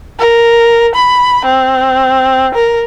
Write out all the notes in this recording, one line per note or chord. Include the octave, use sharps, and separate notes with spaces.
A#4
B5
C4
A#4